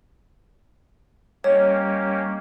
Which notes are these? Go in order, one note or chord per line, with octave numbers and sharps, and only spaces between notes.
G3 A#3 C#4 G4 C#5 D#5